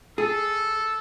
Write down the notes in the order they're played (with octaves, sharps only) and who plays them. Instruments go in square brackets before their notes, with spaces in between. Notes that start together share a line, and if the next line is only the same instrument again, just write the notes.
[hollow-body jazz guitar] G#4 [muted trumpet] A4